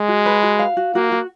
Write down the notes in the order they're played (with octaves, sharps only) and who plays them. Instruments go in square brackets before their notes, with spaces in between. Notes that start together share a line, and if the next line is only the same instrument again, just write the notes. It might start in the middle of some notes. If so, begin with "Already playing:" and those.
Already playing: [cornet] G#3
[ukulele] F#4
B4
F#4
F5
F#4
[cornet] A#3 [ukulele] F#4
[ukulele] F#4